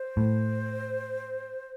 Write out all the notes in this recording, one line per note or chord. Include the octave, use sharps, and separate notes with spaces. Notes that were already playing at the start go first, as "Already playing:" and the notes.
Already playing: C5
A2